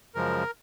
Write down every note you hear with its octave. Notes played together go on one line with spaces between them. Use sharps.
F#2 C#3 F3 G#3 A#4